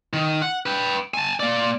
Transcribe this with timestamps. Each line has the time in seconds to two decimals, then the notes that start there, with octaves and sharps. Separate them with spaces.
0.13 D#3
0.42 F#5
0.66 B4 G5
1.14 G#5 A5
1.40 A#3 D5